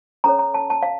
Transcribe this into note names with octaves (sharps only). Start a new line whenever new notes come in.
C#4 A4 C#5 A#5
A#5
A5
A5
F5